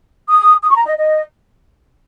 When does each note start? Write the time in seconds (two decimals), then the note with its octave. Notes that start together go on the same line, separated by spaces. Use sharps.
0.29 D#6
0.63 D#6
0.69 C#6
0.73 A#5
0.85 D#5
0.96 D#5